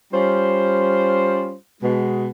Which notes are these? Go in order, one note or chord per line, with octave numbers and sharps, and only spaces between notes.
G3 C#4 F4 C5
B2 G#3